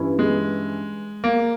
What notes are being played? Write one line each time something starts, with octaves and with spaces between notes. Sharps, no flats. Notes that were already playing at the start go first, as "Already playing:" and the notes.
Already playing: G2 E3 C#4 E4
G#3
A#3